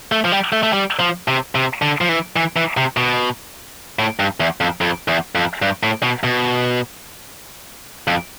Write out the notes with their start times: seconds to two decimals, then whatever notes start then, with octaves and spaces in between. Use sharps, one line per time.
0.12 A3
0.25 F3
0.32 G3
0.53 A3
0.63 A3
0.73 G3
1.00 F3
1.28 C3
1.55 C3
1.82 D3
2.01 F3
2.09 E3
2.36 E3
2.57 E3
2.77 C3
2.97 B2
3.99 A2
4.20 G2
4.40 E2
4.61 F2
4.81 F2
5.08 E2
5.35 F2
5.62 G2
5.83 A2
6.03 B2
6.24 B2
8.08 F2